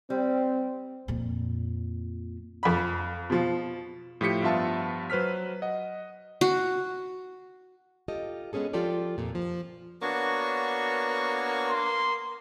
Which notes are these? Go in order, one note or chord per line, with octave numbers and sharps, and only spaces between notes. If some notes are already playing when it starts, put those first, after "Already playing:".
G3 C4
F2 A#2
F2 B5
B2 F3
A2 F3 G4 B6 C#7
G2 F3 B3 F4 E5 A5
F#3 B4 C5 F6 B6
D#5 F#5
F#4
F4 G4 A4 D#5
G#3 B3 C#4 G#4 A4
F3 F4 G4 A4 D5
F2 A#2
F3
A#3 B3 D4 F#4 C#5 C#6
C6